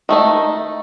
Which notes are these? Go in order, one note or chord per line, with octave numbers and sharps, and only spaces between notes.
D#3 A3 D#4